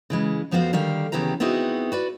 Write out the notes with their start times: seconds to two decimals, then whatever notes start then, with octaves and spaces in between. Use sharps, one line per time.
0.10 C#3 E3 G#3
0.51 F2 F3 B3 F#4 C5 F5
0.73 D3 D#3 G3 A#4 F5
1.12 D#2 C#3 E3 B3 G4 A#5
1.40 B3 C4 D#4 E4 F#4 G#4
1.92 F#4 B4 D5